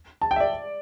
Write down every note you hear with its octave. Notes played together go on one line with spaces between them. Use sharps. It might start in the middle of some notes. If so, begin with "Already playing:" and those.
A5
G5
E5
D5